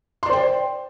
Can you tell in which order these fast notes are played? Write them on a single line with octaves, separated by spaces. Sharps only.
C6 D5 C5 G5